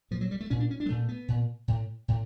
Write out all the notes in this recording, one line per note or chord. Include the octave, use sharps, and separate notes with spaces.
A#2 F3
F#3
G3
A3
A#2 C#4
D4
C#4
D4
G#3
A#2 A3
B3
A#2
A2
A2